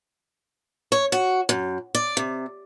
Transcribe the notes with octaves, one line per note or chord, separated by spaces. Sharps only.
C#5
F#4
F#2
D5
C3